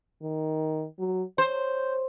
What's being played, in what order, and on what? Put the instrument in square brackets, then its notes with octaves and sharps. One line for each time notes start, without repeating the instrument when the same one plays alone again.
[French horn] D#3
F#3
[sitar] C5 [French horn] C#5